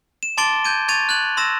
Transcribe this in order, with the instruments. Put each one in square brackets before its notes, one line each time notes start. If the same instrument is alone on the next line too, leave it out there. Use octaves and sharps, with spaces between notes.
[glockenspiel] E7
A5 C6 D6 A6 D7 G7
G6 G#6 D#7
C#6 G#6 A6 D#7 F7
F#6 G#6 F#7
C6 E6 A#6 E7